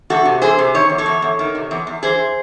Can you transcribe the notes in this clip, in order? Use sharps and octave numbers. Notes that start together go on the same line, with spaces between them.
E2 F#4 A4
C3
E2 G#4 C5
C3
D#3 C#5
E2
A4 C#5
E2
E2
D#3
C3
E2
E2
E3 G#4 C5